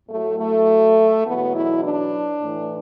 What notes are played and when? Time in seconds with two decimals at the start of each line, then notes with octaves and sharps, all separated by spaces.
0.09 A2 F#3 A3
0.38 A3
1.25 E2 B2 F#3 B3
1.54 E4
1.83 D4
2.41 A2 E3